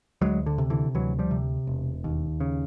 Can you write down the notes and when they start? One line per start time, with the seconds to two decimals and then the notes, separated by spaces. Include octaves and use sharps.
0.21 D2 F#3 G#3
0.46 D3
0.58 C3
0.70 D3 E3
0.95 D2 E3 F#3
1.19 F3 G3
1.31 C3
1.67 E1
2.04 D#2
2.40 C#3